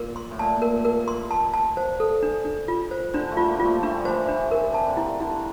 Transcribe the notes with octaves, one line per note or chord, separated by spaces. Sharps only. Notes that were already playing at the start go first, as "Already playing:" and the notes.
Already playing: A#2 A#4
C6
A2
A#2 A5
A#4
A#4
C6
A5
A5
C5
A4
D4
D4
F4
C5
D3 D4
F3 A3
F4
G3 A#3
F4
F3 A3
A3 D4
G3
F3
E3 G3 C5
D4
E3 A#4
C3 A5
D3
E4
D3 E4